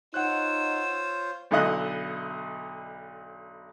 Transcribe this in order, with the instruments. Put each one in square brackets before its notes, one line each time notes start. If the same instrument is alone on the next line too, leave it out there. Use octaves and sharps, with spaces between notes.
[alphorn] D#4 [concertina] F4 C5 C#5 [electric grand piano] F#5 F#6 [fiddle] E6
[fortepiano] B1 D3 E4 D#5 F#6